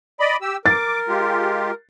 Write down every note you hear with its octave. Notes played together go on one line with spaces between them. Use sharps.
D5 D#5 B5
G4 E6
A#4 D6 A6
G#3 F4 G4